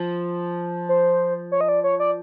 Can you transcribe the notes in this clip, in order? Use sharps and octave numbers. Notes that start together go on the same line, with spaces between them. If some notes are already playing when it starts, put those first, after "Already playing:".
Already playing: F3
C5
C#5
D#5
D5
C#5
D5